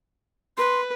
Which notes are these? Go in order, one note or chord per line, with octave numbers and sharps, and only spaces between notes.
B4 C6